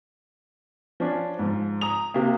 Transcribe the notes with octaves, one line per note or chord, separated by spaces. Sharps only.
F3 C#4 D4
G#2 F3
A#5 D#6 F7
C3 A#3